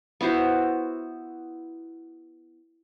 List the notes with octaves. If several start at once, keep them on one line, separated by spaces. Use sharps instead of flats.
B3 E4 F#4 C5